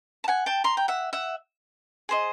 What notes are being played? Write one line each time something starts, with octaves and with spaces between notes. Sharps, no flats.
A5
F#5 G#5
G5 A5
A#5 C6
G5
E5 F#5
E5 F#5
G#4 C5 D#5